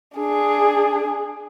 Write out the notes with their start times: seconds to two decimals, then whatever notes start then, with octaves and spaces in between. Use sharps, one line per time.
0.16 D4 G#4